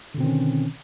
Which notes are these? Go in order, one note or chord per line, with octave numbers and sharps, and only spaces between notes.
B2 D3 D#3 C4 C#4